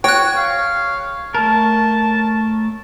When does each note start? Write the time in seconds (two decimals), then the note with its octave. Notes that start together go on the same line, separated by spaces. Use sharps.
0.04 F#4 C#5 G5 F#6
0.37 F5
1.35 A3 A#4 A5